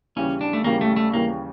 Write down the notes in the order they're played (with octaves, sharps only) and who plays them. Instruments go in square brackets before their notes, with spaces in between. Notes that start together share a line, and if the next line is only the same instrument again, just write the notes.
[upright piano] D#2 C#3 E3 G3 [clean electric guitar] C#4
[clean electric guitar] D4
A3
[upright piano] D#2 C#3 E3 G3 [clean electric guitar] A#3
[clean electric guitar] A3
A3
[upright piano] D#2 C#3 E3 G3 [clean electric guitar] A#3